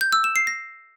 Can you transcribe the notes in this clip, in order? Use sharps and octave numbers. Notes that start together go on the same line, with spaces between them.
G6
E6
E7
C7
A#6